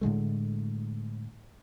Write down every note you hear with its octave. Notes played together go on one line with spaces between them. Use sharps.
A2 D3 G#3 A3